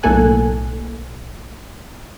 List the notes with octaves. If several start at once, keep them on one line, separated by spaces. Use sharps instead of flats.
B1 A2 A#3 A4 G#5 F#6